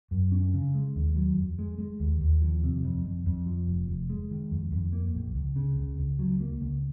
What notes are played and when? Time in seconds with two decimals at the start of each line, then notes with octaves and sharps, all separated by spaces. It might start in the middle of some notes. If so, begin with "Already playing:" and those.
0.11 F#2
0.32 C#4
0.54 C#3
0.75 G#3
0.96 D#2
1.16 F#3
1.37 F2
1.59 G#3
1.78 G#3
2.00 D#2
2.21 D#2
2.42 F3
2.63 C3
2.84 F2
3.05 F2
3.26 F2
3.46 F3
3.67 F1
3.88 F1
4.10 G#3
4.31 D#3
4.51 F2
4.72 F2
4.93 A#3
5.15 A#1
5.35 C#2
5.56 C#3
5.77 C#2
5.99 C#2
6.19 F#3
6.40 A#3
6.61 C#2